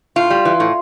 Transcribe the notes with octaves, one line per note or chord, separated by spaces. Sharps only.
A2 F4
G3
E3
A2